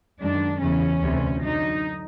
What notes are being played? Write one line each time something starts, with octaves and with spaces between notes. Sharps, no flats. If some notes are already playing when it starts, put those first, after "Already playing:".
F#2 D#3 G#3 D4
E2 C#3 E3 C#4
D2 C3 E3
F#2 D3 F#3 D#4